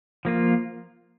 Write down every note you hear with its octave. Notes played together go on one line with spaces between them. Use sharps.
F3 A#3 F4